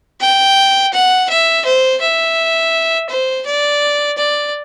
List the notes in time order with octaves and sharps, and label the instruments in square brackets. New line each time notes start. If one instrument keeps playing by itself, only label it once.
[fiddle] G5
F#5
E5
C5
E5
C5
D5
D5